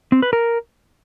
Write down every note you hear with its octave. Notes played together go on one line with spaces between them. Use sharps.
C4
B4
A#4